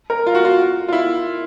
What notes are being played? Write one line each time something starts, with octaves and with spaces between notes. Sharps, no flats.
A#4
F4
F#4
F4
F4
E4